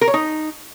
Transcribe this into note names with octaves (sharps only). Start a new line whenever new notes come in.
A#4
C#5
D#4